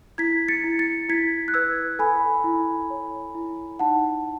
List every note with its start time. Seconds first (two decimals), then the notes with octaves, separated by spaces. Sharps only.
0.18 E4 G#6 B6
0.48 A6 C#7
0.64 E4
0.79 A6 C#7
1.09 E4 G#6 B6
1.48 F#6
1.54 B4 E6 G#6
1.99 A4 G#5 B5
2.44 E4
2.90 C#5
3.35 E4
3.79 D#4 F#5 A5